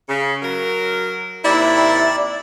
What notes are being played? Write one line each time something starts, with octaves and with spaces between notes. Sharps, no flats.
C#3
F#3 A#4
D#2 C3 E4 D5